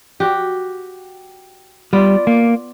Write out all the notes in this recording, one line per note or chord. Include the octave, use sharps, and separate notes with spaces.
F#4 G4
G3 B3 F4 D5
A#3